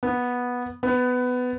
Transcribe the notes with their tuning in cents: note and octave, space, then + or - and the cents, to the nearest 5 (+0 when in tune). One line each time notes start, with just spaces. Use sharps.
B3 -10
B3 +15